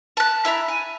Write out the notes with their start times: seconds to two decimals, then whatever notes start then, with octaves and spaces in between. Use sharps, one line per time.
0.17 A5 F#6
0.45 E4 E5 A#5 B5
0.68 G#5